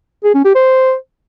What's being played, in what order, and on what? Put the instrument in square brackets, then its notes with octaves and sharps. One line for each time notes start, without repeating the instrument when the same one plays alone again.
[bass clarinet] G#4
C#4
G4
C5